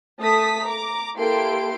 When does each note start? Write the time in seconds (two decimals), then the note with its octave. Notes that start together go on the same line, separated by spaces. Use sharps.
0.20 A3 A5 D#6 B6
0.64 A#5 D6
1.17 A#3 E4 G4 A4 C6 D7